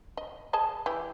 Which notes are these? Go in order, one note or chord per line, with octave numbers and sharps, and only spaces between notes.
D#5
G#4 D#5 A5
E3 G4